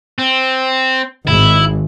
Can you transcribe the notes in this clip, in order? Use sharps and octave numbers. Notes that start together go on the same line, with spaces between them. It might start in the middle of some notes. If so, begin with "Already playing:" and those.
C4
G#1 E4